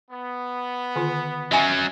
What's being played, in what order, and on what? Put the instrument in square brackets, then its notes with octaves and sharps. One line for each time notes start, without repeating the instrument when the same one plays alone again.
[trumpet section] B3
[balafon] D3 D#3 F4
[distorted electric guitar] F#3 C#4 [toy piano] D#5 E5 G#5